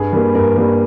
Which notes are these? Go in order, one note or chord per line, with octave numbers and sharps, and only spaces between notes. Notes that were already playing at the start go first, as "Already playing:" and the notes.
Already playing: G2 G#4
G3 A#3
G2 A#4
G3 A#3